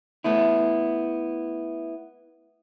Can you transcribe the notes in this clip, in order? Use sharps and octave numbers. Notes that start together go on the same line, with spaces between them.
A3 B3 E4